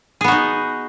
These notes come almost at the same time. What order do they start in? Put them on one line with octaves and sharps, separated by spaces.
G#4 B3 F#4 D#4